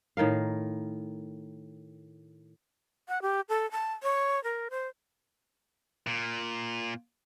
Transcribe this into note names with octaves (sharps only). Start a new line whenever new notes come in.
A2 D#3 A#4 F5
F#5
G4
A4
A5
C#5
A#4
C5
A#2